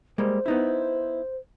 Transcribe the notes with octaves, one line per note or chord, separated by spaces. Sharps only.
G3 G#3 A#3 C5
B3 D#4 E4